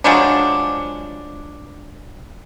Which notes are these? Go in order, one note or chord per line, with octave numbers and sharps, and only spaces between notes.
F3 F#3 G#3 D4